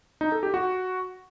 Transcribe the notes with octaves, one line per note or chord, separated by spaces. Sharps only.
D#4
A4
G4
F#4